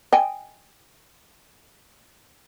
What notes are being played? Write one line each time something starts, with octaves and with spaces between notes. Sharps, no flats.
D#5 G5 G#5